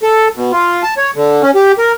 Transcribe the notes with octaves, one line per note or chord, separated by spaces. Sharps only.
A4
B2
F4
A5
C#5
D3
C#4
G4
A#4